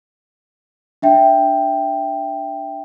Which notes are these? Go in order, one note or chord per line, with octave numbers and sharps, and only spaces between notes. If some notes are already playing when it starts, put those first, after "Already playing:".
D4 E5 G5